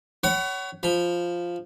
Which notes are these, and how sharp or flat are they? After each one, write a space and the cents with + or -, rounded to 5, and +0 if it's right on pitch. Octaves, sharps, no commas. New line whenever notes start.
C#5 +15 F#5 +35 B5 +25
F3 +0 B5 +0